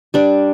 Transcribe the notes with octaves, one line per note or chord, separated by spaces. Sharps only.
G3 D4